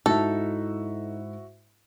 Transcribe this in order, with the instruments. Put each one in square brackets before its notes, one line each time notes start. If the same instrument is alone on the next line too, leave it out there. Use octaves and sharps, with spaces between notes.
[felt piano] G#2 E4 [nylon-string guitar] D#4 [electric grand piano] F#4 E5 [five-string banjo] A4